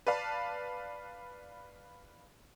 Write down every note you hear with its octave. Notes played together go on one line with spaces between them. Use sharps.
B4 D5 F5 A5